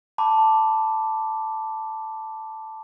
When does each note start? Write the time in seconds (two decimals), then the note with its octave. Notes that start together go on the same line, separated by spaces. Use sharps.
0.18 A5 B5 D6